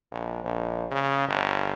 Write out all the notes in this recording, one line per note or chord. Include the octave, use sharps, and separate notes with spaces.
A#1
A#1
C#3
G1